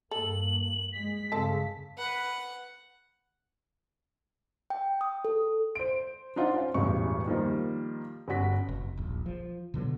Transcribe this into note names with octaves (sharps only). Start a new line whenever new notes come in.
G2 A#3 A4 F#7
G#3 B6
G2 C#3 C4 A4 A5
B4 F#5
G5
D#6
A4
C5 D7
D4 D#4 F4 C5 F#5
C#4 C5 F5
E1 A1 E2 G2 C#6
D#3 F3 G3 A#3
G1 C#4 F#4 B6
F1
D#1 A#1
F3
B2 D3 F#3 B3